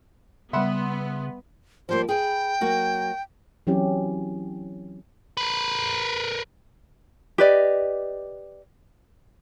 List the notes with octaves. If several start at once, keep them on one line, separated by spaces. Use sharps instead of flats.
C#3 G3 B3 E5 F#5 B5 C6
F3 G3 A#3 C5
G#4 B4 G5
F#3 A#3 F#4
E3 F#3 C4 C#4 E4 G4
A#4 B4
G4 B4 D5 D#5